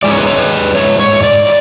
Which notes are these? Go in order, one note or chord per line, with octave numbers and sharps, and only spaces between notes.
G#2 G#3 D5
C#5
B4
C#5
B4
C#5
C#5
D5